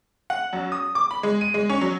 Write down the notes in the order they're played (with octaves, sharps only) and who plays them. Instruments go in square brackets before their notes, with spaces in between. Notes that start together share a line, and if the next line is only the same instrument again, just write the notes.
[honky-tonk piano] F#5
F#2
D#6
D6
B5
G#3
D#7
G#3
C#4
F#3